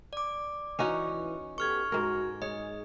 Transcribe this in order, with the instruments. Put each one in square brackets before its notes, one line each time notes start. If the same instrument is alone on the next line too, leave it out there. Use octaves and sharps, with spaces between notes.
[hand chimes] D5 D6
[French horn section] E3 [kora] C#4 D#4 F#4
[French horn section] B3 G4 A4 [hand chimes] C#6 F6 G#6
[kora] G#2 A#4 [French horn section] F#4
[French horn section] G#3 G#4 [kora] C#5 [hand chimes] D#5